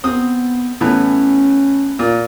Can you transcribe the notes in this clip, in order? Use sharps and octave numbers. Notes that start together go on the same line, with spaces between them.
B3 C4 D#6
A2 E3 B3 C#4
A#2